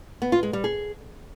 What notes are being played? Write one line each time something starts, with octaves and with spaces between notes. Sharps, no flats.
B3
F4
G#3
G3
G#4